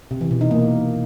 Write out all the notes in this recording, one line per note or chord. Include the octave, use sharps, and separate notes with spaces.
C3
E3
B2
D#4
A#3